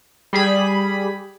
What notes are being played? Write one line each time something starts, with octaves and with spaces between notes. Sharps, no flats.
G3 G#4 B5